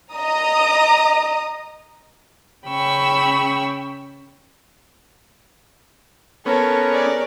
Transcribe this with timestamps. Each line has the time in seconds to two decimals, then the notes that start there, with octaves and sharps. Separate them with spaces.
0.14 D#5 A#5 D#6
2.67 C#3 C#4 G5 B5 C#6 E6
6.46 B3 C#4 A4 A#4 C#5
6.88 G#4 D5